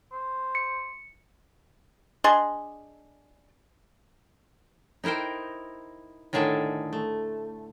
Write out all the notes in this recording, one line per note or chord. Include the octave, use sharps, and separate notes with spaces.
C5
C#7
D4 G#4 D#5 C6
D#4 E4 A#4 C5 G5
A2 D3 D#3 G#4 A4 E5
A3